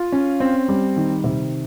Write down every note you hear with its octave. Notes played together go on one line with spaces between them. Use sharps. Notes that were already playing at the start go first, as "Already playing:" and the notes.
Already playing: F4
C#4
C4
G3
D#3
C3